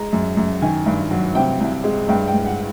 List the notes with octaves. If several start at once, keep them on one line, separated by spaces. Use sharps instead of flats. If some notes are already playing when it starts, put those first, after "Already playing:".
Already playing: G#3 A#5
F#2
F#2
D#3 G#5
G2
F#3
C3 G5
C2
G#3
G2 G5
G5
G2
F#5